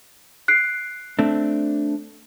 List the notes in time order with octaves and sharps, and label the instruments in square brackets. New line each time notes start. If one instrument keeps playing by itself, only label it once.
[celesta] F#6 C7 D7
[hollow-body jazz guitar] A3 C4 D4